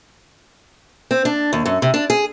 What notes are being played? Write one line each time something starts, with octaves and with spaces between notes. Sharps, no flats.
C4
D4
D#2
F#2
C3
D4
G#4